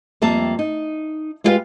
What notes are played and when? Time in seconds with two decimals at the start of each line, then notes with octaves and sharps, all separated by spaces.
0.22 F2 G3 A#3 E5 A5
0.59 D#4
1.44 G#3 E4 F4 G4 B4 F5